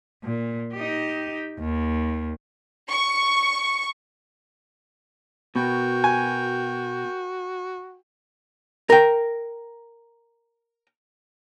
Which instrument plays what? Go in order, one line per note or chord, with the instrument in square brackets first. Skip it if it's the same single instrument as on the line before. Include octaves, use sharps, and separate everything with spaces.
[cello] A#2
D#4 G4
D#2
[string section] C#6
[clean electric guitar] B2 [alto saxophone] F#4 [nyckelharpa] A#4 G5
[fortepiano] G#5
[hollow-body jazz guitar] A#4 G5